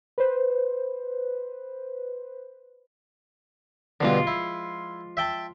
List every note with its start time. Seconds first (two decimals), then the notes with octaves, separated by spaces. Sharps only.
0.18 B4 C5
4.01 G2 B2 D3 F3 G#3 F4
4.27 E4
5.17 E5 G5 A5